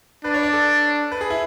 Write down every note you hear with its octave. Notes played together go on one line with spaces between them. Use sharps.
D4 B4
C#5
D5
A4
B4
G#4
E4